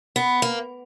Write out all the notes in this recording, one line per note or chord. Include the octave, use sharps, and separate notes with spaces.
B3
A#3